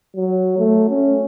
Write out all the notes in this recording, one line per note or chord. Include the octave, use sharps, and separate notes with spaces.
F#3
A3
C#4